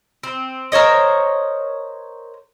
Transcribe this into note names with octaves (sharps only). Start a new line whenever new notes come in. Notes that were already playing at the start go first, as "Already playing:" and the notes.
C4
A#4 C5 C#5 D#5